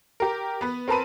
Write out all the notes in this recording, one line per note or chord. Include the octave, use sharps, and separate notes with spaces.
G4 A#4
B3 B4
C4 A#4 B4 A5 B5 D#7